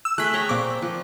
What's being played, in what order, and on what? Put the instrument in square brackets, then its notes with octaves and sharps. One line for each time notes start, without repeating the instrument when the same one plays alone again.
[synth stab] E6
[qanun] A3 G#4 [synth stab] F#6 B6
[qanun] C#5 G5 A#5
[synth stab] A#2 D6 [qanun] C4
[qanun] F3